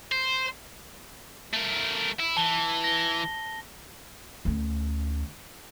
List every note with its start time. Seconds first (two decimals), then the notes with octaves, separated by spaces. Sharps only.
0.12 C5
1.54 A3 A#4
2.19 E4
2.37 E3 A5 G7
2.84 A#6 G7
4.45 D2 C#4